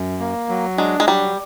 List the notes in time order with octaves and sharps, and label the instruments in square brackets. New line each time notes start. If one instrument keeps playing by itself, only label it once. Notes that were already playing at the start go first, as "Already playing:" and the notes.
Already playing: [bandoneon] F#2
A#3
F#3
[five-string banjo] G#3 [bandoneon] D4
[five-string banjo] G#3
[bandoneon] F#3 [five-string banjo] G3